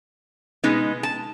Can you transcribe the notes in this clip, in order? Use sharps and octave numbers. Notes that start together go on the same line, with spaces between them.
B2 G#3 B3 D#4
A5